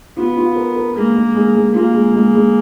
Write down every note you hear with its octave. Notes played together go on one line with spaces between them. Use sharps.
B3 F4
F4
A#4
A#4
G#3 A#3
G#3
G#3
G#3
A#3 F4
G#3
G#3
G#3